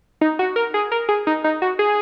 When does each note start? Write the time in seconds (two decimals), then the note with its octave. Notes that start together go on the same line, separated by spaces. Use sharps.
0.21 D#4
0.39 F#4
0.56 A#4
0.74 G#4
0.92 A#4
1.09 G#4
1.27 D#4
1.44 D#4
1.62 F#4
1.79 G#4